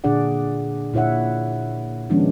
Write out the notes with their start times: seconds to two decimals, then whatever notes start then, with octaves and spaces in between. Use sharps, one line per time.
0.04 A#2 D3 D4 G#4 D5 F#5
0.94 A#2 E4 C#5 E5 F#5
2.09 D#3 F3 G#3 B3 C#4 D4